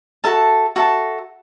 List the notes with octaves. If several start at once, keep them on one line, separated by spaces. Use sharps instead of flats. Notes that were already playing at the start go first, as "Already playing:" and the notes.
F#4 A4 E5 A5
F#4 A4 E5 A5